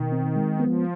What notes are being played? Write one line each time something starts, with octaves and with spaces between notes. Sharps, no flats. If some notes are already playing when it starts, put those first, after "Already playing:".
Already playing: B2 D#3
C4
G#3
F3 B3